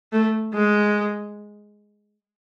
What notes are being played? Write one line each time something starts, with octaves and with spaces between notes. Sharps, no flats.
A3
G#3